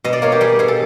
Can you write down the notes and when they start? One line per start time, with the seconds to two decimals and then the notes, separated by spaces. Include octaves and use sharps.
0.04 B2 D#5
0.13 D5
0.22 A#3 C#5
0.32 G4
0.41 G3 G#4
0.59 B2 G#4
0.68 A4